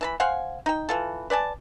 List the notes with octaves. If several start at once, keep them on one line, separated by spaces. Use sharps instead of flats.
E3 A5 B5
C5 F5 F#5 G#5
D#4 G5
E3 F4 A4
B4 D5 G#5 A5